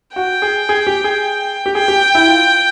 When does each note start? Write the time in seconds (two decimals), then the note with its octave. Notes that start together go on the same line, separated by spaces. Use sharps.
0.16 F#4 G5
0.42 G#4
0.69 G#4
0.87 G4
1.04 G#4
1.66 G4
1.75 G#4 G5
1.88 G4
2.15 E4
2.28 F4